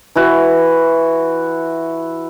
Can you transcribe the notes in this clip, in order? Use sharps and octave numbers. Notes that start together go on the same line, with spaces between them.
E3 E4 F#4